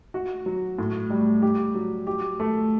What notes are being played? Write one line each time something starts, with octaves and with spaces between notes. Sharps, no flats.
F#4
F#3
A2
G3
G4
F#3
G4
A3